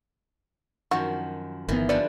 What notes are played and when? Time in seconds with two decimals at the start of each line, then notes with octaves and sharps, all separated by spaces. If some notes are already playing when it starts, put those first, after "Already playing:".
0.91 F#2 D#3 F3 F#4
1.68 G1 D#3 E3 B3
1.89 D3 F3 G3 A4 B4 D5